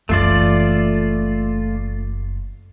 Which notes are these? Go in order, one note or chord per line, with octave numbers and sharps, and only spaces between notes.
F#1 E3 A3 F4 D5